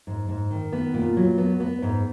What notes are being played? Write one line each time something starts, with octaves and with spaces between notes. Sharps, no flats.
G#2
G#2
D#3
B3
A#2
F#3
B3
B3
G#2